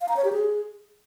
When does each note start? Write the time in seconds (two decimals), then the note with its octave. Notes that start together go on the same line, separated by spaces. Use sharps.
0.01 F5
0.09 A#5
0.17 C#5
0.24 G4
0.32 G#4